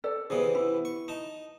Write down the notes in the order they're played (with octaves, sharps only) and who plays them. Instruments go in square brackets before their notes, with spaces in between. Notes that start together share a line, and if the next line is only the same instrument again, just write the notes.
[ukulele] A4 D5
[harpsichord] C3 E3 B3 [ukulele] G#4
[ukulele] E4
[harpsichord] C#6
D#4 A5